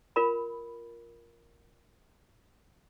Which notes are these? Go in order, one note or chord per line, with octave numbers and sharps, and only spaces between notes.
F4 A#4 B5